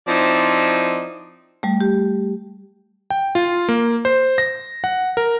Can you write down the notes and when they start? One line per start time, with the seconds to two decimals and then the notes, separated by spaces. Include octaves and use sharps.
0.08 F3 C4 D#4 E4 D5
1.63 G3 A3
1.81 G4
3.10 G5
3.35 F4
3.69 A#3
4.05 C5
4.38 A#6
4.84 F#5
5.17 A#4